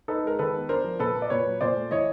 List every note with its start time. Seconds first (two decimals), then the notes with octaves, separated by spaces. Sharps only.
0.08 D#4 A4 B4
0.24 G#3 A#4
0.39 D#3 A4 B4
0.55 B3
0.69 D4 A#4 C5
0.84 F3
1.00 A#2 A4 B4
1.15 A#3
1.22 D5
1.30 A#2 B4 C#5
1.46 F#3
1.61 A#2 C5 D5
1.76 A3
1.91 E3 C#5 D#5